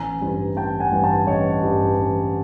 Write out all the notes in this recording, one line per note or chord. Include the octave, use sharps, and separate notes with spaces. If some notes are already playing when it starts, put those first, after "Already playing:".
Already playing: A1 G#5 A#5
G2 E3 G3 C4
A1 G5 A5
F#5 G#5
G2 E3 G3 C4
G5 A5
A1 C#5 D#5
G2 E3 G3 C4
A1